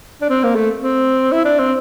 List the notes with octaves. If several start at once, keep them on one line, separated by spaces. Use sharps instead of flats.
D4
C4
A#3
A3
C4
E4
D4
C4